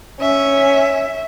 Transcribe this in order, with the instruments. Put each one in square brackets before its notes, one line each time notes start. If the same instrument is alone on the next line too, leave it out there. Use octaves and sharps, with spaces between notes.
[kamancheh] C#4 [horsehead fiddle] E5